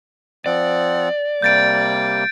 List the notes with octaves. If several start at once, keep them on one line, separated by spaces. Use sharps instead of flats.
F3 C4 D5 F#5
C3 G3 A#3 G6 A6 D7